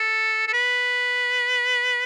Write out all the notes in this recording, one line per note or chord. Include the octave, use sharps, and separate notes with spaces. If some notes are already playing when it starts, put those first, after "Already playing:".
Already playing: A4
A4
B4